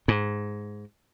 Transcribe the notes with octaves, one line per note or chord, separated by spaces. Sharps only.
G#2